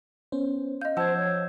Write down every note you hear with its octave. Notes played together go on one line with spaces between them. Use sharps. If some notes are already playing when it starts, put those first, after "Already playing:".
B3 C#4 C5
D#5 F5 G6
F3 C5 F#5 A5 E6 G6 G#6
C#5